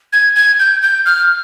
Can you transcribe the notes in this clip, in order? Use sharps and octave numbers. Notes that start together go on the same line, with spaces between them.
G#6
G#6
G6
G6
F6